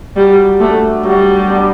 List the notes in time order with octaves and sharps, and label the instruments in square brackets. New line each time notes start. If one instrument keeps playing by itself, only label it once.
[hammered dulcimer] F#3 [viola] G3
[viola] A3 [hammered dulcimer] B3 D4
[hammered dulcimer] F#3 [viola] G3
[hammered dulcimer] B3 D4